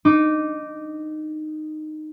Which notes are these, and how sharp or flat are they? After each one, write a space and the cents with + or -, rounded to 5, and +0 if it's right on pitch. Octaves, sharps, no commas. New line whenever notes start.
D#4 -15 D6 -5